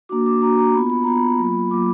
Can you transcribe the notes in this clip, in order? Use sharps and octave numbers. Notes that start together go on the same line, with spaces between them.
A#3 D4 F#4 D6
D6
A#3 D4 F#4 A#5
A#5
B3 F4 B5
B5
B3 F4 A#5
B5
F#3 A#3 F4
F#3 A#3 F4 D6